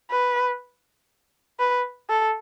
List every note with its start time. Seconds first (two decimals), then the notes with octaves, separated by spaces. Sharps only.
0.11 B4
1.59 B4
2.10 A4